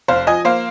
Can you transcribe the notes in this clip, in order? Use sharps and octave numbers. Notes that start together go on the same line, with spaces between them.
F1 C5 F5
F3 D#5 G#5
A#3 C5 F5